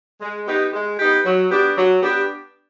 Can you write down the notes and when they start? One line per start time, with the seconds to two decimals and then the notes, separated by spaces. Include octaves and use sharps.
0.21 G#3
0.47 B3 D#4 G4
0.73 G#3
0.99 B3 D#4 G4
1.24 F#3
1.50 B3 D4 G4
1.76 F#3
2.02 B3 D4 G4